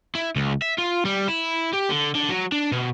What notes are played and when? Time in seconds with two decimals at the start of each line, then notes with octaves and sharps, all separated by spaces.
0.15 E4
0.36 C#2
0.62 E5
0.78 F4
1.05 G3
1.28 E4
1.73 G4
1.89 D3
2.15 D3
2.30 F#3
2.52 D4
2.72 B2